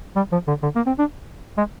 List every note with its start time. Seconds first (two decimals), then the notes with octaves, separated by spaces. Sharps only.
0.16 G3
0.32 F3
0.48 D3
0.63 D3
0.76 A#3
0.87 C4
0.99 D4
1.58 G#3